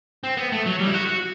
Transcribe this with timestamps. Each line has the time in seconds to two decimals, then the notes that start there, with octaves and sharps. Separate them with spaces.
0.24 C4
0.37 B3
0.52 A3
0.66 F#3
0.80 G3
0.87 E4
0.94 F#4
1.07 F#4